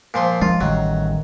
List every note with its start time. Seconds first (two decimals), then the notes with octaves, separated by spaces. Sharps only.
0.14 A#2 F3 C6
0.42 F3 G#3 F4
0.61 A1 D#3 F#3 G3